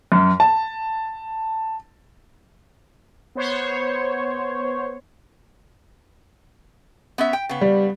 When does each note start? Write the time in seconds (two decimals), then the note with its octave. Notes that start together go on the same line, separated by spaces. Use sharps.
0.12 F#2
0.40 A5
3.35 B3 C5 C#5
7.18 B3 C#4 E5
7.33 G5
7.49 C#3 B3
7.61 G3